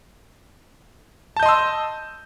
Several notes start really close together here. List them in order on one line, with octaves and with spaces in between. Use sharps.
A5 G6 D#5 C6 E6